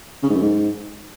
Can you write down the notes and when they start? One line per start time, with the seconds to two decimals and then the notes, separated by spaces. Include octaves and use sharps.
0.23 C#3
0.29 G#2
0.35 F#2
0.42 G#2